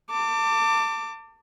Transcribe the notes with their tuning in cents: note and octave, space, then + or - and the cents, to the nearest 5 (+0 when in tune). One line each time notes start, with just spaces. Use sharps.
A5 +35 D6 +0